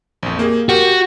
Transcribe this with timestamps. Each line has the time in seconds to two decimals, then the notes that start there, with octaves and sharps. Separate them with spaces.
0.23 A#1 F2
0.39 A#3 G4 G#4
0.69 F#4 G4 A#4
0.85 G4